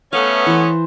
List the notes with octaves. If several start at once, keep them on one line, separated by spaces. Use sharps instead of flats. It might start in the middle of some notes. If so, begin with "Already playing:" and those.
A3 B3 C#4 F5
E3 C5